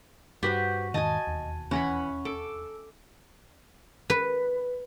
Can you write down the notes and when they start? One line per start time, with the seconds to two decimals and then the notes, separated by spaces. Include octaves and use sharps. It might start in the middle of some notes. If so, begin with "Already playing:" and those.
0.43 G2 F#4 G4 B4 C5
0.94 E1 G#2 D#3 D#5 G#5 A5
1.27 E1 D#2
1.71 E3 C#4 F#5 B5
2.25 A4 D6
4.10 B4